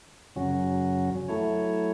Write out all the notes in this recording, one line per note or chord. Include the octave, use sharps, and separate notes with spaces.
F#2 C#3 F#3 C#4 F#4
F#3 A3 E4 A4 C#5